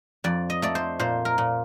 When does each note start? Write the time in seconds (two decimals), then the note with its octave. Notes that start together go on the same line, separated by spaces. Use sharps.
0.24 F2 D5
0.50 D#5
0.62 A3 D5
0.75 C5
0.99 A#2 C5
1.25 A#4
1.38 A#2